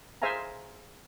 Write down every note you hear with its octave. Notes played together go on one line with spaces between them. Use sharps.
G#4 C5 E5 F5 G#5 A#5